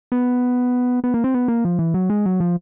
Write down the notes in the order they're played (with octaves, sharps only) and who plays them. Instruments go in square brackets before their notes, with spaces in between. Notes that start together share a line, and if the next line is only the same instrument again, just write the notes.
[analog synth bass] B3
B3
A#3
C4
B3
A#3
F3
E3
F#3
G#3
F#3
F3